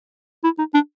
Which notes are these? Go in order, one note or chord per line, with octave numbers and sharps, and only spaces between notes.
E4
D#4
D4